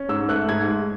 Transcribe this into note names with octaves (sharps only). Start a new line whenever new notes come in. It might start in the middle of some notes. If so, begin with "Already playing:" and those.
Already playing: C#4
G#2 E6
A3 F#6
G#2 G#6
G#3